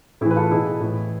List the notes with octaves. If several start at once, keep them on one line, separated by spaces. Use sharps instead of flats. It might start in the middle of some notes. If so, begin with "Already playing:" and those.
A2 E3 E4 G#4
B4
F4 A4
B2 E4 G#4
A2 E3